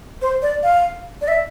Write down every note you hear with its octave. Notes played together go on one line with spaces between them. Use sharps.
C5
D5
F5
D5
E5